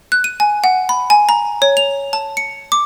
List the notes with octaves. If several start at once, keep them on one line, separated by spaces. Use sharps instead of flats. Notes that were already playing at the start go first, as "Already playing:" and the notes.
F#6
D#7
G#5
F#5
B5
G#5
A#5
C#5
F7
A5
C#7
D6